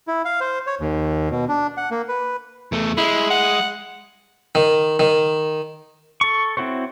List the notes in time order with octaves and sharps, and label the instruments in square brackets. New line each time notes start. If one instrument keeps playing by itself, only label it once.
[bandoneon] E4
F5
C5
C#5
D#2
B2
D4
F#5
A#3
B4
[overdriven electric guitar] E2 A3
[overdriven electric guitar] G#3 [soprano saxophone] E4
[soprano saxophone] F#5
[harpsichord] D#3
D#3
[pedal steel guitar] A4 C#6
C4 E4 F#4 C5 C#5